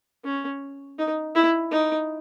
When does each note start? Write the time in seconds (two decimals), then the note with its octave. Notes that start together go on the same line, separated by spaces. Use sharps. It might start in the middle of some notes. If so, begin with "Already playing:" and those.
0.24 C#4
0.99 D#4
1.35 E4
1.71 D#4